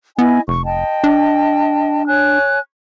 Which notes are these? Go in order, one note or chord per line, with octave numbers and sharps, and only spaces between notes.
B3 E4 D#5 G#5
F1 C#6
D#5 G5 A5
D4
C#5 G#5 F#6